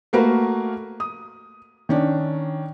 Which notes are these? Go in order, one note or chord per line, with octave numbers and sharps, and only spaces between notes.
A3 A#3 F#4 A#4 B4 F5
D#6
D#3 C#4 D4